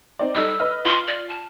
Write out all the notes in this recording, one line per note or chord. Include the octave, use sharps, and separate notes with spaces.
C4 D#4 D5
G3 D#4 A4 E6
B4 D#5 F6
F4 C6
D5
A5